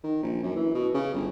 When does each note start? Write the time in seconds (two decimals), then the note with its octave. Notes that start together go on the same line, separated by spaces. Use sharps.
0.04 D#3
0.23 A#1
0.43 F#2
0.56 E3
0.75 B2
0.94 C#3
1.14 G1